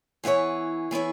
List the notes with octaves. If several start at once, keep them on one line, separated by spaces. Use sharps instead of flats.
E3 B3 E4 G#4 C#5
E3 B3 E4 G#4 C#5